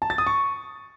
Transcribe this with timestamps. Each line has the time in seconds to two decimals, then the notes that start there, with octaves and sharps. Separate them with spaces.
0.02 A5
0.10 A6
0.18 D#6
0.27 C#6